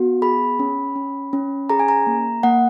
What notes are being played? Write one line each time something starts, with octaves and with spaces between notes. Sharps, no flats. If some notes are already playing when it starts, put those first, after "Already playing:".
Already playing: B3 F#4
G#4 B5
C#4
C#4
C#4
G#4 A#5
G#5
A#5
A#3
A#3 F#5